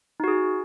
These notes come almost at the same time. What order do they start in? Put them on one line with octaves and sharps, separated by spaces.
D#4 F#4 G#4